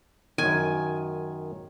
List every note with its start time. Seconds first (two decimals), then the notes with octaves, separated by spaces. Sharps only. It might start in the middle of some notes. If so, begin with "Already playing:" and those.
0.38 F#2 D#3 G#5